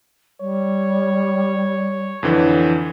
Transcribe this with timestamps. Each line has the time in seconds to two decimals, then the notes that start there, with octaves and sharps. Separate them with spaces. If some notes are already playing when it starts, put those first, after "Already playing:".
0.41 G3 C#5
2.23 F2 D3 E3